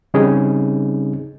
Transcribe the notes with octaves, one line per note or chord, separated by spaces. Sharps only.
C#3 G3 C4 C#4 D#4 G#4